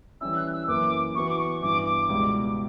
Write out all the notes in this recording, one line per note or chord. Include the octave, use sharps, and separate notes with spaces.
E3 G3 C#4 E4 E6
F#6
E6
F#2 E3 A#3 E4 B4 D6
E3 B3 F#4 B4 C#6
D6
C#6
G2 E3 B3 D6
D6
C#2 B2 G3 B3 E4